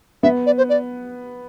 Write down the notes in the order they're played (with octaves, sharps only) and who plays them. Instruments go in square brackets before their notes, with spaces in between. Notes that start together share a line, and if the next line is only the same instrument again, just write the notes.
[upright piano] B3 [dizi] E5
[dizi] D5
C5
D5